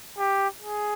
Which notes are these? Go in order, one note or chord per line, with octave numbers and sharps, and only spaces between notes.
G4
G#4